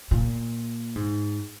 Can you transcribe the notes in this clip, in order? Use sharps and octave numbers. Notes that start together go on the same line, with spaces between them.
A#2
G#2